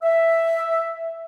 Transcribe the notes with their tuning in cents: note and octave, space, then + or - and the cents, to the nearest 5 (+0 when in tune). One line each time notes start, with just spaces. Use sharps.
E5 +5